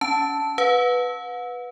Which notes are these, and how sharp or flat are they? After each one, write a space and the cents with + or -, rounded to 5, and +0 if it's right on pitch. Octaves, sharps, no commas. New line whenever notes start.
C#4 +30 A5 +0
B4 +0 F#5 -40